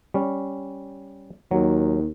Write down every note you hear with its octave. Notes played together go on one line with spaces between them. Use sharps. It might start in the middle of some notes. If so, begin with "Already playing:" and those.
G3 C#4
D#2 F#3